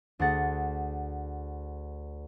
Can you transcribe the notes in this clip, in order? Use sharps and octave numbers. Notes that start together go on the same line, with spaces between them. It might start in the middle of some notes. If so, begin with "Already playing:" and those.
D2 G#4 F#5 A6